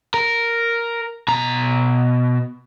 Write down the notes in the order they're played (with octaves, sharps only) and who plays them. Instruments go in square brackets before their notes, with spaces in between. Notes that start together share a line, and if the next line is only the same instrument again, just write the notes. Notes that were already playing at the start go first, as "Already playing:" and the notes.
[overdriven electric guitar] A#4
B2 A#5